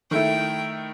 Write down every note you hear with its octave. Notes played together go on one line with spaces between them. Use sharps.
D#3 A3 E4 G5